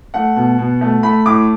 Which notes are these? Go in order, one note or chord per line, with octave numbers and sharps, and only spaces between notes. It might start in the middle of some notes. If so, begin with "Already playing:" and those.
A3 F#5
B2
B2
A3
A3 B5
A2 D6